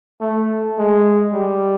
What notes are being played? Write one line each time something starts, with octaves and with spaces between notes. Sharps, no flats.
A3
G#3
G3